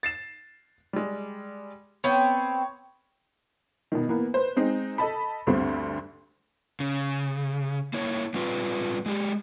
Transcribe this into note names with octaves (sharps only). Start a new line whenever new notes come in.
A6 C7 E7
G3 G#3
B3 C4 C#5 G5
B2 D#3
E3 A#3 B3
B4 C5
G#3 C4 D#4
A4 D#5 A5 B5
D2 G2 D3 G3 A3 C4
C#3
A#3 E4 C#5
G3 C4 F4 B4
G#3 G4